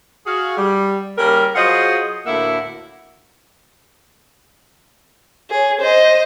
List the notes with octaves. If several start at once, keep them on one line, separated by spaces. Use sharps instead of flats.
F#4 G#4 F5
G3
C#3 G3 A#3 C#4 A#4
F#3 F4 G#4 C5 D#5 F#5
D2 A2 A#3 E4 E5 F#5
G#4 C#5
C5 D#5